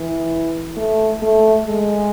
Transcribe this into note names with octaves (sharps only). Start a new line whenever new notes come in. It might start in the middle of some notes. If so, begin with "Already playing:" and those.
Already playing: E3
A3
A3
G#3